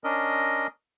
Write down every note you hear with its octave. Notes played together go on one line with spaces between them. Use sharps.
C#4 D4 A#4 D#5